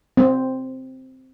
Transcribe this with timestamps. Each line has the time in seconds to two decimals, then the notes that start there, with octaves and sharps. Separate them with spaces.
0.17 C4